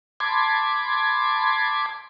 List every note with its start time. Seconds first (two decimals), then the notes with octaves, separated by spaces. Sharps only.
0.20 A5 B5 C6 D6 G#6